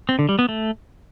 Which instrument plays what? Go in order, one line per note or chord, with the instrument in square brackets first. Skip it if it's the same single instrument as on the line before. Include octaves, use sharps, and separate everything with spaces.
[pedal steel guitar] C4
D3
G3
B3
A3